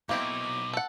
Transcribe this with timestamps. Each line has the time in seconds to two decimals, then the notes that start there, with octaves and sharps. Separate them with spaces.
0.09 B2 A#3 C4 D#4 E4 D6
0.73 A4 F#5